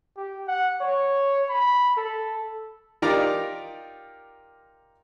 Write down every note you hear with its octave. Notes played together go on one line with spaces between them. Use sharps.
G4
F#5
C#5
B5
A4
D#4 F4 G4 A#4 D5 A#5